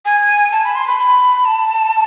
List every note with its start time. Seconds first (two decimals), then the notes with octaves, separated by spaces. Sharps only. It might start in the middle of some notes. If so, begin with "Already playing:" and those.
0.05 G#5
0.52 A5
0.64 B5
0.76 C6
0.87 B5
0.99 B5
1.45 A5